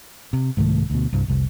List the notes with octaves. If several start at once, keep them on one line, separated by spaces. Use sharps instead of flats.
C3
C2 G#2 D#3 A3
D2 B2
C2 G2
F1 C2